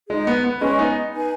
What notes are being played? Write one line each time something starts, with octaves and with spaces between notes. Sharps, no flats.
G#3 D#4 G#4 D#5
B3
B3
G#3 C#4 B4 D#5 G#5 C#6
B3 D#4
D#4 B4 G#5